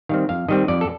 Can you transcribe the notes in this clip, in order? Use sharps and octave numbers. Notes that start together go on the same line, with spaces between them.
D#3 G3 C4 F5
F2 F5
D#3 G3 C4 D#5
F2 D5
A4